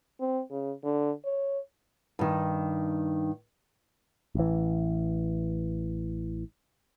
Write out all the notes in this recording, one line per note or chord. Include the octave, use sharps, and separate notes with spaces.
C4
C#3
D3
C#5
G2 D#3
A1 E3